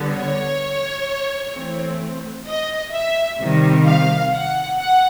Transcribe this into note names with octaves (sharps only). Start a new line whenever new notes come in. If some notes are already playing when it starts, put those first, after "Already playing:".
Already playing: D3 G3 B3
C#5
E3 A3 C4
D#5
E5
C3 D#3 G3
F5
F#5
F#5